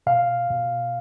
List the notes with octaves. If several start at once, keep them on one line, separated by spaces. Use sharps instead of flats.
B2 F5
B2